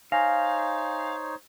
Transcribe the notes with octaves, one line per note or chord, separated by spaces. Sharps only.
D#4 C5 C#5 F5 G#5 A#6